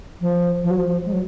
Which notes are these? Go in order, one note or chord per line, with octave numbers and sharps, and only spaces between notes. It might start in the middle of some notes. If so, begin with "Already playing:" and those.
F3
F3
F#3
F3
G#3
F#3